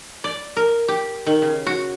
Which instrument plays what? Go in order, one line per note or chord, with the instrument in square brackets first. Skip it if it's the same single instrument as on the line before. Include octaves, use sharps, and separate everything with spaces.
[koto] D5
A#4
G4
D#3
C#3
F#4